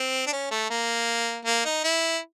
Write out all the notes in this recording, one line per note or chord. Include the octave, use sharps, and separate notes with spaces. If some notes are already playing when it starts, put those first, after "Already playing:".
Already playing: C4
D4
C#4
A3
A#3
A#3
D#4
E4